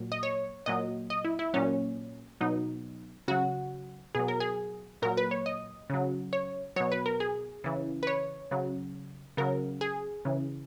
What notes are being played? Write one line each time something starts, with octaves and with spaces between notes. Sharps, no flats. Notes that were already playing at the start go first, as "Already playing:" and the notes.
Already playing: A#2 F#3
D#5
C#5
A#2 F#3 D#5
D#5
E4
E4
A#2 F#3 C#4
B2 F#3 D#4
C#3 F#3 F#4
B2 F#3 G#4
A#4
G#4
A#2 F#3 A#4
B4
C#5
D#5
C#3 F#3
C#5
B2 F#3 C#5
B4
A#4
G#4
C#3 E3
B4
C#5
C#3 F#3
C#3 F#3 A#4
G#4
C#3 E3